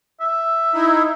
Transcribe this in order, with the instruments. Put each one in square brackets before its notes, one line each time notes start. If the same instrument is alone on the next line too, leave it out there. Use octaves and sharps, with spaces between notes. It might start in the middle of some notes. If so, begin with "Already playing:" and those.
[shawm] E5
[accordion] D#4 E4